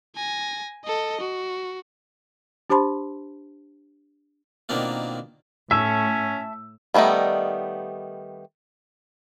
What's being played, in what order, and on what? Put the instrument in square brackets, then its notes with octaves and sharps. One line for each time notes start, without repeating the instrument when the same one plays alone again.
[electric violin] G#5 A#6
A4 D#5
F#4
[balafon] D4 G4 C5 A5 B5 C6
[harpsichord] B2 D#3 A#3 C4 D4 F4
[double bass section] A2 [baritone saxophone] C#4 [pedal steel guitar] E5 A5 C#6 [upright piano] E6
[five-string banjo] D#3 G3 A3 B3 D#4